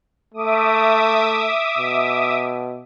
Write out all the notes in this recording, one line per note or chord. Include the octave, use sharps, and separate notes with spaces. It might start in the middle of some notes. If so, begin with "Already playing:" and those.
A3 E5 D6 D#6
B2